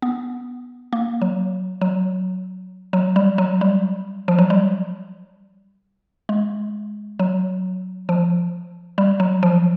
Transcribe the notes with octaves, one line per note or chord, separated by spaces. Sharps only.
B3
A#3
F#3
F#3
F#3
G3
F#3
G3
F3
F#3
G3
G#3
F#3
F3
G3
F#3
F3